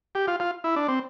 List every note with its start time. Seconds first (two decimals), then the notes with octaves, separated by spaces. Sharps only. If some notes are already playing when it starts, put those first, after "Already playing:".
0.15 G4
0.28 F4
0.40 F4
0.64 E4
0.76 D4
0.88 C4